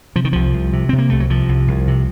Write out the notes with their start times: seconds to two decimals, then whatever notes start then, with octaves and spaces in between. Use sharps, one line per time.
0.15 C3 F3
0.25 D#3
0.33 C2 F3
0.54 C2
0.73 C3
0.89 C3 C4
0.98 A#3
1.10 C2 A3
1.20 F#3
1.30 C3 F3
1.49 C2
1.68 C2
1.88 C3